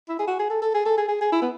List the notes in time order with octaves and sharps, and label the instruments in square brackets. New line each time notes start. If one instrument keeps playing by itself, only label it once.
[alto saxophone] E4
G#4
F#4
G#4
A4
A4
G#4
A4
G#4
G#4
G#4
E4
B3